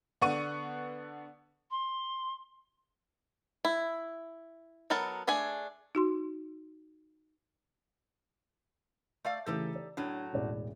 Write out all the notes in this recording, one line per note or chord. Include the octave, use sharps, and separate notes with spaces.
D3 B3 F#5 C#6 D#7
C6
E4
F#3 B3 A4 A#4 A5
A3 D4 G#4 G#5
D#4 F#4 C6
A3 D5 F5
C#3 E3 A3 D#4 G4 A4
D5
A2 F#3 D4
E1 A1 D5